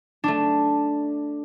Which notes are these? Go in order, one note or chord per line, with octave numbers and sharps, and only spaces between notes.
A3 D4